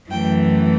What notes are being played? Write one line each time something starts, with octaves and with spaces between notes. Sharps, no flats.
F#2 E3 A3 G5